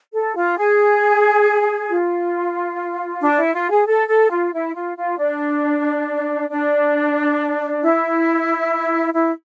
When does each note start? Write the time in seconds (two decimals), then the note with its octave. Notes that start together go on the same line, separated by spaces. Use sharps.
0.13 A4
0.35 F4
0.58 G#4
1.89 F4
3.21 D4
3.37 E4
3.54 F4
3.70 G#4
3.87 A4
4.09 A4
4.30 F4
4.52 E4
4.75 F4
4.96 F4
5.19 D4
6.50 D4
7.82 E4
9.13 E4